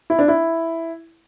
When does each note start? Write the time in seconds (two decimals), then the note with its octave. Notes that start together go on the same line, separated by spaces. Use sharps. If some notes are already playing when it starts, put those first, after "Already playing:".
0.10 E4
0.19 D4
0.28 E4